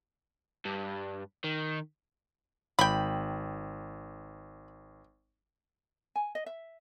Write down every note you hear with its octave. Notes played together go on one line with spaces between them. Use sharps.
G2
D#3
G#1 G5 B5
G#5
D#5
E5